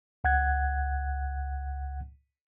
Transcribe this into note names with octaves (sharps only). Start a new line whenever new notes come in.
C#2 F#5 F#6 G#6